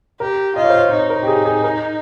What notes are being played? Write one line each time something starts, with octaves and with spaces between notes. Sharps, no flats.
G4 A#4
F4 D#5
C#5
C5
C#5
D#4 C#5
A#4
G4
G#4
G#4
A#4